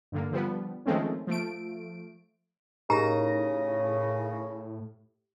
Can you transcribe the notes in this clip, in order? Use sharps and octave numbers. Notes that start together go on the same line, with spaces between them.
G2 D3 A#3
D3 F3 G3 B3
D#3 F3 G#3 A3 C4 C#4
F3 A3 D7
A2 C#3 D#4 G4 A#4 A#5 A#6